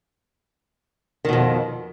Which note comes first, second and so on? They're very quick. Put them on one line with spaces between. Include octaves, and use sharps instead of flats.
D#3 B2 F2